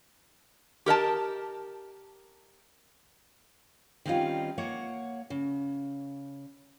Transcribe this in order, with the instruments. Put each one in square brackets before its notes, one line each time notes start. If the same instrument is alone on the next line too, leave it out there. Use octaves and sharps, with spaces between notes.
[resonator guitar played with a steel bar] G4 A#4 D#5 A5
[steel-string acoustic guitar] D#3 G3 C4 C#4 D#4 F4
A#3 C#5 F#5
C#3